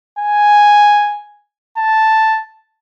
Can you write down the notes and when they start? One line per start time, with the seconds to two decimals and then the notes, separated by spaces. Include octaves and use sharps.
0.19 G#5
1.77 A5